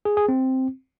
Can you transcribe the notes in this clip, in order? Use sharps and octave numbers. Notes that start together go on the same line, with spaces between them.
G#4
G#4
C4